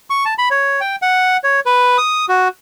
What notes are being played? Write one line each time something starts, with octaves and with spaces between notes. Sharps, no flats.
C#6
A5
B5
C#5
G5
F#5
C#5
B4
D#6
F#4